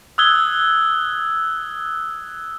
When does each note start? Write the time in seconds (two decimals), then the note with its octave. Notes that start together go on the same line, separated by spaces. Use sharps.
0.18 D#6 E6 F#6 G#6 G7